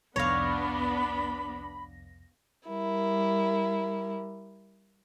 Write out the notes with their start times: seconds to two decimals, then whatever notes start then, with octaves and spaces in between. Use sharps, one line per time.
0.16 C2 F2 B3 D4 C#5 F5 B5 A#6
2.67 G3 E4 A#4